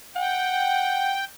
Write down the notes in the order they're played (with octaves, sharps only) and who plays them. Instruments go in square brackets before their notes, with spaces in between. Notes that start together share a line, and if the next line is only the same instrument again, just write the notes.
[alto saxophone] F#5 [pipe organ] G5